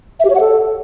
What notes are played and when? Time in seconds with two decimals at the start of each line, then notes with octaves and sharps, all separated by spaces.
0.20 E5
0.25 G4
0.30 C#5
0.35 F#5
0.40 A4